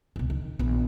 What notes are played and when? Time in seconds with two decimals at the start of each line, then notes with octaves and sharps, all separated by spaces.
0.16 C#2 B2
0.30 D#3
0.59 A#1 B3